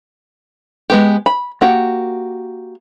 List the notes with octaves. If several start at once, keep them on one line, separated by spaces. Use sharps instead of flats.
G#3 B3 G4
B5
A#3 F#4 G4